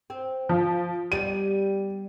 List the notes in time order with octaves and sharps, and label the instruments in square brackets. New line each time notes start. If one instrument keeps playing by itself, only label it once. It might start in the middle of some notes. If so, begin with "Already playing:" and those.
[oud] C4
[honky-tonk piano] F3
[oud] G3 B3 [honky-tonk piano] D#7